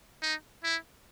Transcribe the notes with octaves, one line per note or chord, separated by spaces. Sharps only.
D#4
E4